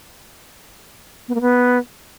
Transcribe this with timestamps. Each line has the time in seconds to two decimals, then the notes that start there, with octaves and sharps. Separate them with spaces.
1.28 B3
1.35 A#3
1.41 B3